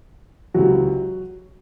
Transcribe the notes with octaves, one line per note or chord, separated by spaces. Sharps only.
C#2 C3 E3 F#3 F#4